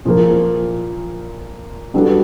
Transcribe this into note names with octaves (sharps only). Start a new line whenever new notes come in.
A#2 F3 A#3
G3 B3 D4 F#4 A4